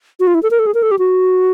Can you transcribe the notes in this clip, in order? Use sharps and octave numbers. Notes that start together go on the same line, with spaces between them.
F#4
F4
E4
A4
A#4
A4
G#4
A#4
A4
G4
F#4